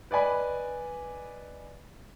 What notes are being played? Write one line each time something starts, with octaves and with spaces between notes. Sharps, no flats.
B4 D5 D#5 G#5 B5